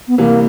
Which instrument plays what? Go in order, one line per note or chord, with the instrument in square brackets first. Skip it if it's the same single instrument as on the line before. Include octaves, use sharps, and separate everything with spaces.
[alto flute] B3
[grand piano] C2 C3 E3 [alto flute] A#3